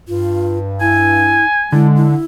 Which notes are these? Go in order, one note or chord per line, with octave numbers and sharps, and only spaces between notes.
G2 F4
E4 G#5
D3 G#3 E4
E4